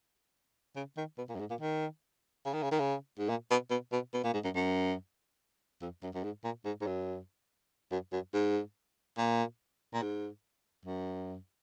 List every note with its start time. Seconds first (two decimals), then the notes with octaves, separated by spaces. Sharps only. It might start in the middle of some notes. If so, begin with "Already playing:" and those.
0.76 C#3
0.97 D#3
1.18 B2
1.29 A#2
1.35 F#2
1.40 G#2
1.50 A#2
1.60 D#3
2.45 C#3
2.54 D#3
2.63 C#3
2.71 D#3
2.80 C#3
3.19 G#2
3.29 A#2
3.50 B2
3.70 B2
3.92 B2
4.14 B2
4.24 A#2
4.34 G#2
4.44 F#2
4.55 F#2
5.82 F2
6.03 F#2
6.14 F#2
6.24 G#2
6.44 A#2
6.65 G#2
6.81 G#2
6.87 F#2
7.92 F#2
8.12 F#2
8.33 G#2
9.18 A#2
9.94 A#2
10.02 G#2
10.86 F#2